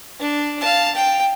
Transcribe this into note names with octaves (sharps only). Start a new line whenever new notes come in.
D4
F5 A5
G5